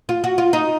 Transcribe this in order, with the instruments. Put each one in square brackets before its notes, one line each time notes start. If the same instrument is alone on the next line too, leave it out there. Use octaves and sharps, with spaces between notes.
[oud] F4
F#4
F4
D#4